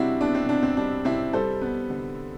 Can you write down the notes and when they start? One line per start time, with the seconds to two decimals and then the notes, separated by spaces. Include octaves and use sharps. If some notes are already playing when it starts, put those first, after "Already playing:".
Already playing: C3 G3 C4 D4 E4 F#4
0.21 B3 D4
0.35 C4
0.49 C3 D4
0.63 C4
0.77 G3 D4
1.05 C3 C4 E4
1.33 G3 A4 C5
1.61 B3
1.90 D3